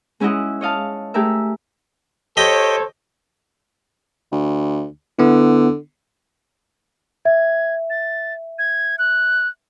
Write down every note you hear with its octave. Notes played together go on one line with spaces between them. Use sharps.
G#3 C#4 E4 F#4 D#5
C#5 D#5 F5 A5
A3 G4 G#4 A#4 E5
G4 A4 C5 C#5 D#5 G5
D2
D3 B3 E4
E5 G#6
A6
G#6
F#6